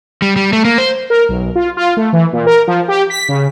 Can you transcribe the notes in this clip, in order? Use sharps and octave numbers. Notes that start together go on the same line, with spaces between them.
G3
G3
A3
A#3
C5
A#4
B1
F4
F4
A3
E3
A#2
A#4
F3
G4
B6
C#3